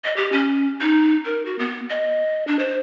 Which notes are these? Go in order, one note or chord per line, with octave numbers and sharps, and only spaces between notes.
D#5
G4
C#4
D#4
A#4
F#4
B3
D#5
D4
C5